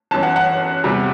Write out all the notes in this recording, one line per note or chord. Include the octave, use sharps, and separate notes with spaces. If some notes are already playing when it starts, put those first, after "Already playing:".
G1 F#2 E3 A5
F#5
F#5
E2 C3 G3